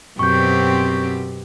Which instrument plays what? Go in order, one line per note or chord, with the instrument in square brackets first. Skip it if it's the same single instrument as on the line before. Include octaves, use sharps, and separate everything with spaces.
[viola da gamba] F#2 B2 G4 [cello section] C4 [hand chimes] C#6 G6